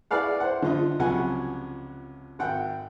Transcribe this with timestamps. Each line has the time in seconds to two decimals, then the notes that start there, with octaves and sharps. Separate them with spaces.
0.11 E4 G#4 B4 D5 F5 F#5
0.40 C5 F#5
0.62 D3 F4 D#5
0.99 C#2 C3 F3 F#3 F#5 G#5
2.39 G#1 F#5 G5